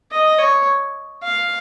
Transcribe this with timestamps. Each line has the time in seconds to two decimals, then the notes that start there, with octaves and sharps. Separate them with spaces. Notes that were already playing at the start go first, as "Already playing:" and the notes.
0.11 D#5
0.38 C#5
1.22 F5